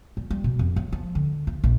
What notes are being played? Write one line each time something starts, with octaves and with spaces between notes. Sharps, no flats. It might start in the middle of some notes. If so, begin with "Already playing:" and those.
G3
G3
B2
F2
F#3
F3
D3
F4
A#1